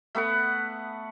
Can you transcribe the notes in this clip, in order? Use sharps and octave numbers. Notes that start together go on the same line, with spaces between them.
A3 B3 B4 F#5